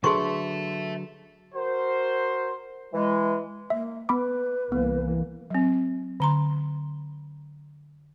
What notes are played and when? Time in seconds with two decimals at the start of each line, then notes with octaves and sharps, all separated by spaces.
0.04 D3 F#3 G#4 A4 B4 E5 C6 C#6
1.55 F#4 A#4 C5
2.93 E3 G#3
3.70 A#3 E5
4.09 B3 B4 B5 D6
4.72 C2 E3 A#3 B3
5.50 F#3 C4
6.20 D3 A#5 C6